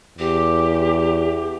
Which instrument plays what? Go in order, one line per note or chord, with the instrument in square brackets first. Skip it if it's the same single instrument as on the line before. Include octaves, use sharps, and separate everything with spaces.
[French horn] E2 [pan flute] G4